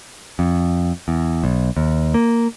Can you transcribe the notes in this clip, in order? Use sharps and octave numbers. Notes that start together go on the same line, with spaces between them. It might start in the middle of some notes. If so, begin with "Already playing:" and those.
F2
E2
B1
D#2
A#3